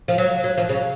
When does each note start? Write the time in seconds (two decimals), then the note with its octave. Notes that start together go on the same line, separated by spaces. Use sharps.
0.08 F3
0.18 F#3
0.44 F#3
0.57 F3
0.69 C#3